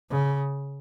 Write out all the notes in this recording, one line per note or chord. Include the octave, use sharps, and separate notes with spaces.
C#3